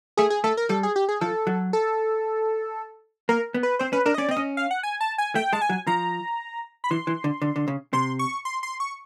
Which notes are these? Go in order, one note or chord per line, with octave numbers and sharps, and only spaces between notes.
A3 G#4
G#4
A3 A4
A#4
G3 A4
G#4
G4
G#4
F3 A4
F#3
A4
A#3 A#4
B3
B4
C4 C5
C#4 B4
D4 A#4
D#5
C#4 D5
C4
D#5
C#4
F5
F#5
G#5
A5
G#5
A3 G5
G#3 A5
G#5
F#3
F3 A#5
B5
E3 C6
E3
D3
D3
D3
C#3
C3 C6
C#6
C6
C6
C#6